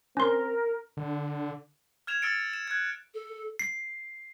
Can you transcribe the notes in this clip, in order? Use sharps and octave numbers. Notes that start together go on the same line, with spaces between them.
C4 C#4 A#4 C6
D3
F6 G#6 E7 F7
E6 F6 A6 C#7 D7
E7
F#6 G#6
A4
C7